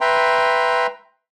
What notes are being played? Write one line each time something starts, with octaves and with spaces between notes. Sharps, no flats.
B4 E5 G5 A#5 C6